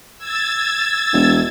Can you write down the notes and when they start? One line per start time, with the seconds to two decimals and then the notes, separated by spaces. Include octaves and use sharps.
0.17 E6 G#6 A6
1.13 E1